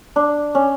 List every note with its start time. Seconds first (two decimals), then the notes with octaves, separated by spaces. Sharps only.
0.16 D4
0.55 C#4